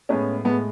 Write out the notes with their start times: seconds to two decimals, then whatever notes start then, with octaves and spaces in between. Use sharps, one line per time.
0.09 A2 G#3 B3 C#4
0.45 A2 G#3 B3